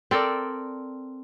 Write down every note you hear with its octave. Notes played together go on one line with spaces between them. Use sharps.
C4 A4 A#4 D5